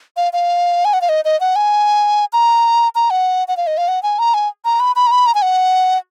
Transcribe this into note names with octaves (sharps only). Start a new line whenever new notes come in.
F5
F5
G#5
F#5
F5
D#5
D#5
F#5
G#5
A#5
A#5
F#5
F#5
F5
D#5
F5
F#5
G#5
A#5
G#5
A#5
B5
B5
A#5
B5
A#5
G#5
F#5